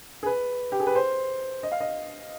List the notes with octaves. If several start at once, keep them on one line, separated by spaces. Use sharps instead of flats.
G#4
B4
G4
G#4
B4
C5
D#5
F5
D#5